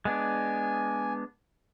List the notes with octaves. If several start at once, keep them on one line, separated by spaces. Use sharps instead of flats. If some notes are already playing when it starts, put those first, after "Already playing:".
G#3 B3 D4 G#5